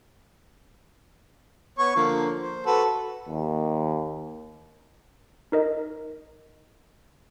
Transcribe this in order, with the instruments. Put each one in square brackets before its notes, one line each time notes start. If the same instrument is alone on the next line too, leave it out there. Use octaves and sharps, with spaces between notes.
[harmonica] B3 C#5 C#6
D3 F3 A#3
C5
F#4 A4 B4
[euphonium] D#2
[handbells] D#4 A#4 D#5